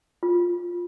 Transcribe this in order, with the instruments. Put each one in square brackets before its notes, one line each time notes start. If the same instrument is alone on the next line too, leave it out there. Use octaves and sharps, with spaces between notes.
[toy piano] F4